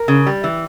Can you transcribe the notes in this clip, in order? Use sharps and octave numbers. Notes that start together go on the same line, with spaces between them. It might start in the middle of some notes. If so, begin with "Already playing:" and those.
Already playing: A#4
C#3
G3
E3